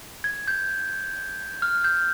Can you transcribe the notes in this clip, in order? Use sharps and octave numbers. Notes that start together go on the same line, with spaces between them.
G#6
G6
F6
G6